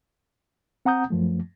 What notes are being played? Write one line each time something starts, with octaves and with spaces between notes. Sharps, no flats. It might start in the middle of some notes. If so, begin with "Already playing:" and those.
C4 F#5 A#5 D#6 G6
F#2 F3 A3